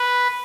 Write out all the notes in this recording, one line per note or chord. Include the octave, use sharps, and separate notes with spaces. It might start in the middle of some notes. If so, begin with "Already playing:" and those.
Already playing: B4